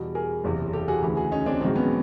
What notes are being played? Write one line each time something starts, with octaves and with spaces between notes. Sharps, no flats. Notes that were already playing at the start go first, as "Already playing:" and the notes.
Already playing: E2 B2 G3
G#4 A#4
F#1 E2 C3
G4 A4
F#4 G#4
D2 C#3 E3
F#4 G#4
C#4 D#4
C4 D4
A#1 G#2 D#3 F#3 C4
B3 C#4